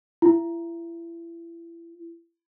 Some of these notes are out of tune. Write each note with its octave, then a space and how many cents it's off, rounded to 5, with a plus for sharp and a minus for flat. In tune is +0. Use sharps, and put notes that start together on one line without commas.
E4 +30